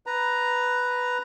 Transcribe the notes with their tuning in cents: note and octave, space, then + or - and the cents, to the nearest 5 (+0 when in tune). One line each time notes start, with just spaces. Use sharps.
B4 +0 A#5 +0